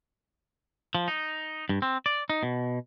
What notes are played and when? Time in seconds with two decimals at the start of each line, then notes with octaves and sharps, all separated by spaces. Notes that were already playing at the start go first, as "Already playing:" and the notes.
0.95 F3
1.08 D#4
1.69 G2
1.82 C4
2.06 D5
2.30 D#4
2.43 B2